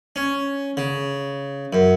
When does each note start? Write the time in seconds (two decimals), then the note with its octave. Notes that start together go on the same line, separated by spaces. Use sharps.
0.16 C#4
0.77 C#3
1.73 F#2